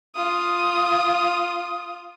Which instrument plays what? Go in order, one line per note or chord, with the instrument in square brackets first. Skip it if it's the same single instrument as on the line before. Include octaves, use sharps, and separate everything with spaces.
[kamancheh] F4 D#6